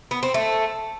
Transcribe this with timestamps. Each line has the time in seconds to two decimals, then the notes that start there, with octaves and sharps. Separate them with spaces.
0.11 B3
0.23 C4
0.34 A3